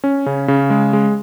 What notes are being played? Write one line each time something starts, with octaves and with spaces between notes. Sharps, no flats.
C#4
C#3
C#3
G#3
G#3